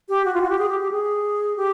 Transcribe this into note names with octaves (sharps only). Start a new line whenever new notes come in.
G4
F#4
F4
F#4
G4
G#4
G4
G4
G#4
G4